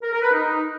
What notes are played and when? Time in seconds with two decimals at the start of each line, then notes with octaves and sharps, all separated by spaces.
0.01 A#4
0.12 A#4
0.22 B4
0.32 D#4